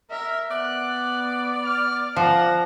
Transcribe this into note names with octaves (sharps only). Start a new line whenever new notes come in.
A#4 E5
B3 D5 F#6
F6
F3 F#5 A#5